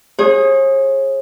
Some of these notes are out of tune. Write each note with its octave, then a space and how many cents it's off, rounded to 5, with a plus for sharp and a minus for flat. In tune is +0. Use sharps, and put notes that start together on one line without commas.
G#4 +0 C#5 -45